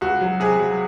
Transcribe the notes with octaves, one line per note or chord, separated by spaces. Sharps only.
C#2 F#4
F#3
C3 G#4
F#3